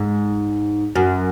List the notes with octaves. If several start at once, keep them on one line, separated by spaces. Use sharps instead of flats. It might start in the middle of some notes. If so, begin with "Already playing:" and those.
Already playing: G#2
F#2